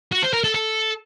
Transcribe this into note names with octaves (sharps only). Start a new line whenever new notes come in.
F#4
C5
A#4
A4
A4